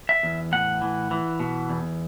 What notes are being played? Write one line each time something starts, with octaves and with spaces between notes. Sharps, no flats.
E5
E2
A2 F#5
E3
E3
B2
E2